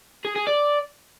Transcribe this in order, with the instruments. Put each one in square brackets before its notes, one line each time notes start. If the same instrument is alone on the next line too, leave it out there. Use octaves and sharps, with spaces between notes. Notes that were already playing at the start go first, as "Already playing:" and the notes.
[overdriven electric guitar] G#4
G#4
D5